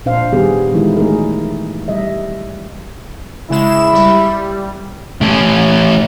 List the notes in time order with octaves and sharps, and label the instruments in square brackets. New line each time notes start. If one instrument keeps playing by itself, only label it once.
[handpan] A#2 D4 C5 F5
D#3 G3 B3 G4 G#4
D#3 E3 F#3 G#3 D#4 E4
A3 D#4 G#4 A#4
G3 D#5 E5
[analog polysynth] C#3 G#3 E7 [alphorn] E4
[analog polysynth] G3
[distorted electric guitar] A2 C#4